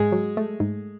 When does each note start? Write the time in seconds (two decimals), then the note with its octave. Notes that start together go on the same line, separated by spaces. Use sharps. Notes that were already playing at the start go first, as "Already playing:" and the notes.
Already playing: G#2 G#3 G#4
0.12 F#3
0.37 A3
0.60 G#2